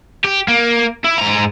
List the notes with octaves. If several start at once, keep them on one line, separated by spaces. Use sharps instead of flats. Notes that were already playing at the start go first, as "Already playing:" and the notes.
G4
A#3
E4
G#2 A#5